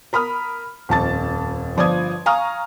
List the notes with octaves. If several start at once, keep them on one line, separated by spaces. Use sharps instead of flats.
A#4 B5 D#6 F6
D#1 F2 A5 A6
G1 F3 D5 D6 D#6 G#6
F5 G#5 A#5 C#6 D#6 F6